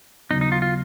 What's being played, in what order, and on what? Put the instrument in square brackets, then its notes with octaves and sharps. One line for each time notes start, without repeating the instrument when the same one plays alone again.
[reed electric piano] D#2 C#3 F#3 B3 [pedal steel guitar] D#4
[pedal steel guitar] D#4
F4
F4